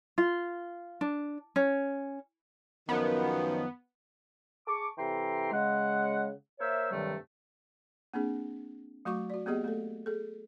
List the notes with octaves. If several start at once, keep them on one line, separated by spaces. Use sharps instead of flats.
F4
D4
C#4
F#2 D#3 F3 B3
G#4 A5 C#6 D6
C3 E3 A4 G5 A#5 C6
C#3 G#3 F#5
A#3 A#4 C5 C#5 E5
G2 C3 D#3 F#3 G3 A3
A#3 C4 D4 G#4
F#3 A3 F#4 C#6 D6
F#4 D5
A#3 B3 G4 G#4 D#5
A3 A4
G#4 A4